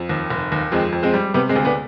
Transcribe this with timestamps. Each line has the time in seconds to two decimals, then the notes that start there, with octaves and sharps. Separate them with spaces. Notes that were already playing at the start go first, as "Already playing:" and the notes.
Already playing: F2
0.09 D#2
0.30 F1
0.52 D#2
0.72 F2 G#3 C4
0.92 F2
1.03 G#3 C4
1.14 G3
1.34 C3 G3 B3
1.49 G#3 C4
1.55 D2
1.65 B3 D4